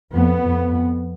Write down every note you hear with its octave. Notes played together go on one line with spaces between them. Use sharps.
F2 B3
F2